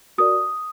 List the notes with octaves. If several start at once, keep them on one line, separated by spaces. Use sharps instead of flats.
F#4 A#4 D5 D#6